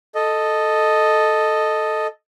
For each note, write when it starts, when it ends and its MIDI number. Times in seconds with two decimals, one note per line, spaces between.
0.15 2.07 69
0.15 2.07 75